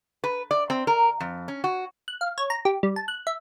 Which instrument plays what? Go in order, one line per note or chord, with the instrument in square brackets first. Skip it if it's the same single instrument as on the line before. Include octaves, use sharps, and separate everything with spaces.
[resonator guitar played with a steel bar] B4
D5
C4
A#4
F2
C#4
F#4
[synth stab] F#6
F5
C#5
A#5
G4
G3
A5
F#6
E5